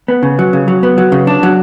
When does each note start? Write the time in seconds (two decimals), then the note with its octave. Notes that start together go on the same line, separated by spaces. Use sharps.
0.08 B3
0.23 C#3
0.39 F#3
0.53 C#3
0.68 F#3
0.83 B3
0.98 F#3
1.12 C#3
1.27 D4
1.43 F#3